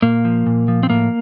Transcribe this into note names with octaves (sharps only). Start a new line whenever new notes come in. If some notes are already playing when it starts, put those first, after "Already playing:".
A#2 A#3
F3
A#2
F3
C4
A2 A#3